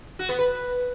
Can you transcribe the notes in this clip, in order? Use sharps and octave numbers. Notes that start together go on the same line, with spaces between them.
F#4
B3
B4